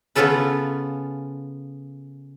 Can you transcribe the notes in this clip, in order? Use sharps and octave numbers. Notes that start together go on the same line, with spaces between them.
C#3 B3 C#4 F4 A4 B4